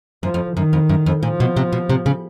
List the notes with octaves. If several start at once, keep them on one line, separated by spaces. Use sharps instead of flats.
F#2 F3
F2
F#2 D#3
F2
F#2
F2
A#2 F3
B2
C3
B2
C3
C#3